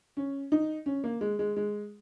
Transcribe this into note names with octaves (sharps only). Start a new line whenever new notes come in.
C#4
D#4
C#4
A#3
G#3
G#3
G#3